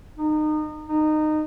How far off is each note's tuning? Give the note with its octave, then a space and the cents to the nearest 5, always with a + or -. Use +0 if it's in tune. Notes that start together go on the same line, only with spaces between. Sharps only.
D#4 -30
D#4 -20